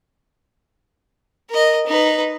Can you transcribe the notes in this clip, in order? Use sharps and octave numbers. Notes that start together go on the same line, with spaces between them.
A#4 D#5
D#4 B4